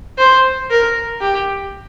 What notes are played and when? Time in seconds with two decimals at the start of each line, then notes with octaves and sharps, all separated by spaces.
0.18 C5
0.70 A#4
1.21 G4